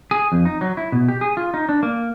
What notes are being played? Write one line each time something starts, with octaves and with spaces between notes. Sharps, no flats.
G#4
F2
D#4
F#3
E4
B2
G4
G#4
F4
D#4
D4
A#3